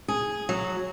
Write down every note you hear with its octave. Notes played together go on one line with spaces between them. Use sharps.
G#4
F#3